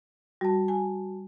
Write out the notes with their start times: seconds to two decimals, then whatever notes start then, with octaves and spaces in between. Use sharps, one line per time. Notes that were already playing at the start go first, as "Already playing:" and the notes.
0.41 G3 F#4 A5
0.68 G#5